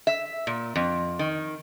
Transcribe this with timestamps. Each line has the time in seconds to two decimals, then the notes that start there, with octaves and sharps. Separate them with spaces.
0.07 E5
0.47 A#2
0.76 F2
1.19 D#3